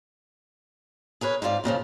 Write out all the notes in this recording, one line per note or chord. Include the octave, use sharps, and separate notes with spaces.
G#4 A#4 B4 C#5
G#2 C4 F4 D5
F2 A#2 C#3 F3